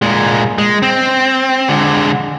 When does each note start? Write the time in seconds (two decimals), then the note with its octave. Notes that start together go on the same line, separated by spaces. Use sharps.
0.02 A#2 G#3
0.58 G#3
0.82 C4
1.68 D3 G#3